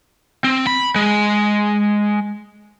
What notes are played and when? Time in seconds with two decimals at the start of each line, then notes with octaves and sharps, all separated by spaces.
0.44 C4
0.67 B5
0.96 G#3